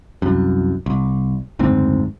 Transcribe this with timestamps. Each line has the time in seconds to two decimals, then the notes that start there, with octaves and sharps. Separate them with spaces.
0.22 C2 F#2
0.86 C2
1.59 F#1 D2 G#2 C4